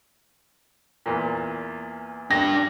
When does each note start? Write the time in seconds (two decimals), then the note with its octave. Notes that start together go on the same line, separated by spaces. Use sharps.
1.06 E2 A#2
2.31 D4 G5 A#6